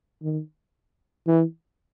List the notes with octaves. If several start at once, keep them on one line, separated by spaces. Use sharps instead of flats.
D#3
E3